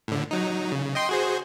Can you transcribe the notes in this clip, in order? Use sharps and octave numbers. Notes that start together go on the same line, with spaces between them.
A2 D3
F#3 D#4
C#3
D#5 G5 C6
F#4 G#4 C5